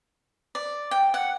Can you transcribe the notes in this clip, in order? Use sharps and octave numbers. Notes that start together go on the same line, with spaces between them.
D5
G5
F#5